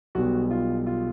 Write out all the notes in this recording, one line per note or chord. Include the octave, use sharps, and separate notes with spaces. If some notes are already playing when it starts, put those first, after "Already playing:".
B1 B2 G3 B3 F#4
F4
F4